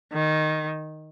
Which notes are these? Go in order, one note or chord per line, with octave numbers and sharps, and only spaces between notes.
D#3